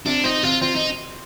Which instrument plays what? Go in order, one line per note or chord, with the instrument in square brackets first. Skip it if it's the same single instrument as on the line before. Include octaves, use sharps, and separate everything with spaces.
[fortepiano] C3 [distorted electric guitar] D4
[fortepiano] C4 [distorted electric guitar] D#4
[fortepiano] C3 [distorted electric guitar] F4
[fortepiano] C4 [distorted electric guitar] F4
[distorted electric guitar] D#4